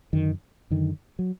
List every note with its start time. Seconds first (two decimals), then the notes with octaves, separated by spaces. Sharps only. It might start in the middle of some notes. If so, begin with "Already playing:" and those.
0.13 F#2 D3 D#3
0.70 F#2 D3 D#3
1.19 F#3